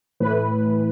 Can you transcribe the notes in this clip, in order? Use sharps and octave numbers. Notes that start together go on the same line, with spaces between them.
A2 E3 B4